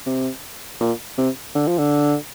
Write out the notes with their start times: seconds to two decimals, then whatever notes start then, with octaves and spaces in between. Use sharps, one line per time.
0.06 C3
0.81 A#2
1.18 C3
1.55 D3
1.67 F3
1.78 D3